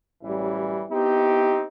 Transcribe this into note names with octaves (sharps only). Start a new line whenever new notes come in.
A1 F#2 E3 G3
B3 C4 D#4 E4 G4